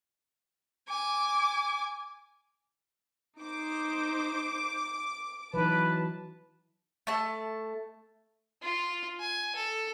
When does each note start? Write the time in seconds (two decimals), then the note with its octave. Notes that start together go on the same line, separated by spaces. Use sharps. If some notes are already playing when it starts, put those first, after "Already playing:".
0.87 G#5 D6
3.41 D#4 C5 D6
5.54 E3 F#3 D#4 B4 A5
7.07 A3 A5
8.62 F4
9.20 G#5
9.55 A4